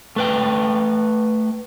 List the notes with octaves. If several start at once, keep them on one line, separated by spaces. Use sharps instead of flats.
A3 B4 G5